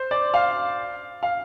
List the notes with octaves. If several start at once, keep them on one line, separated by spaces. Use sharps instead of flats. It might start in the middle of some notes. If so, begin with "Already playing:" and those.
Already playing: C5
D5
F5
F5